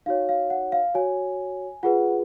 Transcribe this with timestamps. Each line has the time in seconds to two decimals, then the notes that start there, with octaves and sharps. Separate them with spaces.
0.06 D#4 F#4 C#5 F5
0.29 F5
0.50 F#5
0.72 F5
0.94 F#4 C#5 G#5
1.83 F4 G#4 B4 F#5